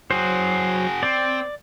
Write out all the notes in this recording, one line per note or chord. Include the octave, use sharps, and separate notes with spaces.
F#3 F#4 G#4 C5
C4 D5